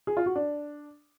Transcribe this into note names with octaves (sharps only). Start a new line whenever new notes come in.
G#4
F4
F#4
D4